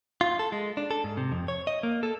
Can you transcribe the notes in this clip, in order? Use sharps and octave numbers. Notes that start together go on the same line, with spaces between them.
F4
A4
G#3
D4
A4
G#2
C3
F2
C#5
D#5
A#3
A4